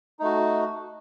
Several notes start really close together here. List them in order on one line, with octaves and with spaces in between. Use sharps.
D#4 A3 F#4